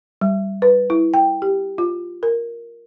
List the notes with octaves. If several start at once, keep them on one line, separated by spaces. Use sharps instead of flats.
G3
B4
E4
G5
G4
F4
A#4